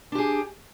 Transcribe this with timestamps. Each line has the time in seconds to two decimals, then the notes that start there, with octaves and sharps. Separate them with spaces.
0.12 D4
0.15 G4
0.18 G#4